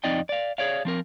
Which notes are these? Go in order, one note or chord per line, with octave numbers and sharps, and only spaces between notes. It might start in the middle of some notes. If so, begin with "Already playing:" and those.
F2 C4 D#4 D5 D#5 G5
D5 F5
G#4 C#5 D5 F5
F3 C4 A#4